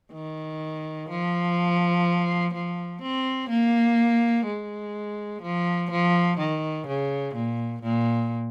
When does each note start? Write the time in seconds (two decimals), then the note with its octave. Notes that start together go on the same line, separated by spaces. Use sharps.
0.13 D#3
1.10 F3
2.54 F3
3.02 C4
3.50 A#3
4.47 G#3
5.43 F3
5.91 F3
6.39 D#3
6.88 C#3
7.35 A#2
7.83 A#2